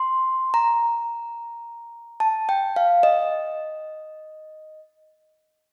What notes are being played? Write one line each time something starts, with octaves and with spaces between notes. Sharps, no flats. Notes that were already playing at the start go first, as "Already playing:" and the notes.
Already playing: C6
A#5
A5
G5
F5
D#5